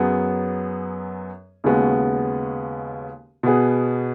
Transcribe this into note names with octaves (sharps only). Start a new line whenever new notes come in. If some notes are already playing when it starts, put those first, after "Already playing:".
Already playing: F#2 F#3 B3 G#4
D#2 C#3 G#3 B3 F#4
B2 B3 G#4